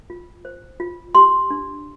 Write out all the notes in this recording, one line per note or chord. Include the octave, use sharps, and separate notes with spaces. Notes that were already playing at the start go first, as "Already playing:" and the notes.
F4
C5
F4
G4 C6
D4